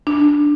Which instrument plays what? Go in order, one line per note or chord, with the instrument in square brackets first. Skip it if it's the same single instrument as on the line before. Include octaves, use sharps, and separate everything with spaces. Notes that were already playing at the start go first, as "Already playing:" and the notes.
[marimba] D4